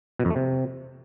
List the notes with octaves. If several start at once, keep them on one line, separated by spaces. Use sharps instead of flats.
B2
F2
A3
C3